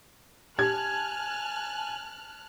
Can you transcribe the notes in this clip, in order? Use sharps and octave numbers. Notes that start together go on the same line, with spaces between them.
G4 G#5 A5 F6 F#6 G#6